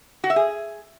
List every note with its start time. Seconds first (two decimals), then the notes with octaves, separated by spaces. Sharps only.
0.24 F#4
0.30 E5
0.36 G#4